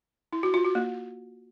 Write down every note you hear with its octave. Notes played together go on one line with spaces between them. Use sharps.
E4
F#4
F4
F#4
A#3